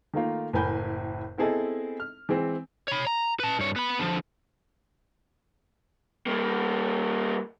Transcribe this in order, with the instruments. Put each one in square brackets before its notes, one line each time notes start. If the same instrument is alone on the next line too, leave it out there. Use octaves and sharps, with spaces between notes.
[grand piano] D#3 A3 A#3 F4
F#1 A2 A#4 G#5 B5 G6
B3 C4 E4 G#4 A4 D#5
F6
E3 G#3 C4
[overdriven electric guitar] C#5 B5
A#5
B4 A5
G2 C#5
B3 B5
D3 F3
[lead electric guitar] G3 A#3